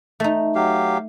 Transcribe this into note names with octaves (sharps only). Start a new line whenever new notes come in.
A3 D#4
F#3 G4 F5